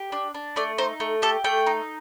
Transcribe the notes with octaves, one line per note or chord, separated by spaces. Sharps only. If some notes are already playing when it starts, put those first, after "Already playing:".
Already playing: G4
D4
D4
A3 D5
D#4 C5
A3
G4 A4
A3 G5
D#4